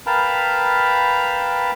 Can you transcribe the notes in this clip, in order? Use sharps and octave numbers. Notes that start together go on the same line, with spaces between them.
A#4 B4 F5 G5 A5 B5